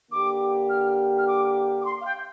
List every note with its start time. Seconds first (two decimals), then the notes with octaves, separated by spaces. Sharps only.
0.11 D3 A#3 G4 D6
0.69 F6
1.17 F6
1.27 D6
1.80 D6
1.84 C6
2.00 F5
2.05 G5